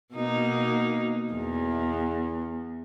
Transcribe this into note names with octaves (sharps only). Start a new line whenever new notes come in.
B2 A#3 D#4
E2